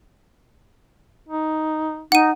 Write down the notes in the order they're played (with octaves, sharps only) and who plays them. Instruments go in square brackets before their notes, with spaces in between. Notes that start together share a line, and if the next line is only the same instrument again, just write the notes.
[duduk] D#4
[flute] D#4 [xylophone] F#5 D#7